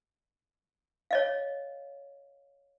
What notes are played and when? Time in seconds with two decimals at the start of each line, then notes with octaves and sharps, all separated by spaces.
1.11 C#5 D#5 F5